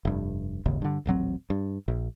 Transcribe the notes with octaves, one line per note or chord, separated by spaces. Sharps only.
F1 G2
D#1 G#1 D#2 C#3
G2 D3
D#1 A1 F#3 C4
G2
A#1